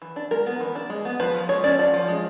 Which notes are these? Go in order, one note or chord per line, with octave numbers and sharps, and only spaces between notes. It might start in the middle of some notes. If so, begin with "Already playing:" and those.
E3
D4
G#3 A#4
B3
E3
D4
G#3
B3
F3 B4
F3
G#3 C#5
C#4 D5
F3 D5
F3
G#3